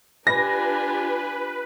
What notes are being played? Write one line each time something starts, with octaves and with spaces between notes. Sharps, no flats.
D4 F4 G4 B4 G#5 A#6